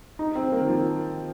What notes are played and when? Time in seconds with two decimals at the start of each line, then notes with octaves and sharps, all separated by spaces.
0.19 D#4
0.35 C4
0.52 A#3
0.61 D#3
0.68 F3